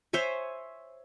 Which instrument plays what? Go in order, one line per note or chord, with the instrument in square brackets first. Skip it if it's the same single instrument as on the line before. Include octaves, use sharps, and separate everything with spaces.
[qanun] C5 C#5 E5 G#5